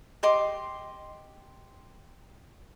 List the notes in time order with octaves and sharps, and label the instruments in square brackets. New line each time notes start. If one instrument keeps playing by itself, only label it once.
[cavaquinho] G4 D#5 C6 D6